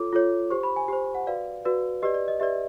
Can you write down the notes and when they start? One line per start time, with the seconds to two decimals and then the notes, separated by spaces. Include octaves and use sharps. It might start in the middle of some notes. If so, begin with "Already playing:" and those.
Already playing: F4 A4 C#5 D6
0.13 F4 A4 C#5
0.50 G4 C5 C#6
0.63 B5
0.76 G#5
0.88 G4 C5
1.15 F#5
1.27 F#4 B4 D5 F5
1.65 F#4 B4 D5
2.02 G4 B4 D5 D#5
2.14 D5
2.28 D#5
2.40 G4 B4 D5 E5